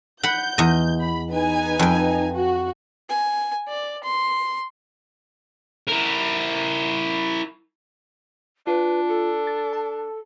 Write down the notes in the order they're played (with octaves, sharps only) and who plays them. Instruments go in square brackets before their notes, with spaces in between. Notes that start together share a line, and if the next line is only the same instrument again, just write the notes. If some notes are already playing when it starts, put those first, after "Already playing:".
[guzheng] F#5 B5 [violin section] G6
[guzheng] E2 D#5
[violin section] B5
D#4 B4 G#5
[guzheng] F2 G5
[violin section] F#4
[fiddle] G#5
D5
C6
[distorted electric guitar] E4 A#4
[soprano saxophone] D4 [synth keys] F4 [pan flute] B4
[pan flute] A4
[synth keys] A6
A5